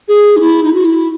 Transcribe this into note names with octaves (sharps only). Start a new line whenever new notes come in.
G#4
D#4
E4
D#4
F#4
E4